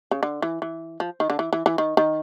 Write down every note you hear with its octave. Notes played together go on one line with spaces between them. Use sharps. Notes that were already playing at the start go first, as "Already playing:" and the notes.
C#3
D3
E3
E3
F3
D#3
D3
E3
E3
E3
D#3
D#3